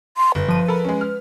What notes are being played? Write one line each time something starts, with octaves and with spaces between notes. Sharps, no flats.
C6
G1 B4
F3 D#7
A4 A#4 B5
G#3 C#4
F6